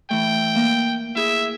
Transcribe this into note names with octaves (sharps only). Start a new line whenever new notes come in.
E3 A3 G5
A#3
E4 G#4 E5